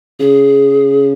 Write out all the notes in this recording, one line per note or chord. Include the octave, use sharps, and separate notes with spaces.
C#3 G#4